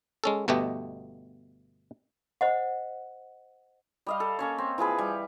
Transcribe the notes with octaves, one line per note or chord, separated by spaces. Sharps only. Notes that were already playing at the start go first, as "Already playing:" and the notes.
G#3 C#4 A4
G1 B2 A3 B3 G4 D#5
C5 D#5 F#5
G3 D#5 F5
A4
A#3 C#4 C#5
C4
E3 F3 G#4 B4
G3